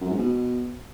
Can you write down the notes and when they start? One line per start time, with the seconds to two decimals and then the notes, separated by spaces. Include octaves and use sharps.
0.01 F#2
0.10 G#2
0.18 B2